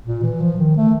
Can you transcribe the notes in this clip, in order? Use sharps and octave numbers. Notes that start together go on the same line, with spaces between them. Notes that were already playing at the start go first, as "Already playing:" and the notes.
A#2
E3
F3
D#3
A3